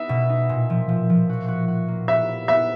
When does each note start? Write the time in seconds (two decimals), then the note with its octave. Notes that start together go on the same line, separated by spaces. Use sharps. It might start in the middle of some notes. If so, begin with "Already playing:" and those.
Already playing: B3 D#4 E5
0.09 B2
0.29 D#4
0.49 A#2
0.70 F3
0.89 F3
1.10 F3
1.29 F#4
1.48 F#4
1.68 F#4
1.88 A#3
2.08 B3 E5
2.29 E4
2.48 B3 E5